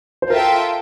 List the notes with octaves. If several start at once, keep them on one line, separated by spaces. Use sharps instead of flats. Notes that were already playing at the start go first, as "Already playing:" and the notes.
C5
F4 A4 A#4 E5 G5